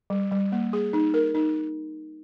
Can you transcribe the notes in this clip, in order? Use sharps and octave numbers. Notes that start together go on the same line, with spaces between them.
G3
G3
A#3
G#4
D#4
A#4
D#4